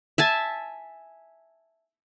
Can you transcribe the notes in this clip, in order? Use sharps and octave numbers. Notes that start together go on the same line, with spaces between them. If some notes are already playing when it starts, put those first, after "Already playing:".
E5 G#5 A5